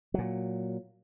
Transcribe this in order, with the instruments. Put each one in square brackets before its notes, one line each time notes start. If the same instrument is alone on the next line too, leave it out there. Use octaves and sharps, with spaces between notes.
[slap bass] A#2 F#3